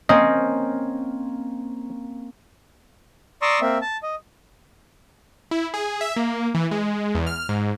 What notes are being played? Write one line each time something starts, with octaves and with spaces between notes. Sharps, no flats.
A#3 C4 C#4 D#5
D5 A#5 C6 C#6 D#6 E6
A#3 C4 E5
A5
D#5
E4
G#4
E5
A#3
E3
G#3
E2
F6
G#2